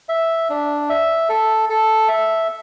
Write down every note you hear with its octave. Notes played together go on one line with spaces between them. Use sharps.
E5
D4
E5
A4
A4
E5